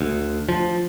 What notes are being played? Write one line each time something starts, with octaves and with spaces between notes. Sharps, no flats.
D2
F3